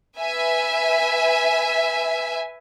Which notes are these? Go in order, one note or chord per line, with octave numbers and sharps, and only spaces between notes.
B4 E5 G#5